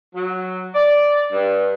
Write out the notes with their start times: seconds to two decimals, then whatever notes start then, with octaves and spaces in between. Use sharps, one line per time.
0.15 F#3
0.75 D5
1.32 G2